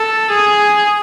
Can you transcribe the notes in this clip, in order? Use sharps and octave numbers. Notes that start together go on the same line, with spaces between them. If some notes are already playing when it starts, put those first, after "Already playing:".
Already playing: A4
G#4